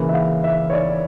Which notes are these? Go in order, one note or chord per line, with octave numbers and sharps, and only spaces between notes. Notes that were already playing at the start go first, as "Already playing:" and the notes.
Already playing: C#3 E3 A#3
E5
F5
E5
C#5
D5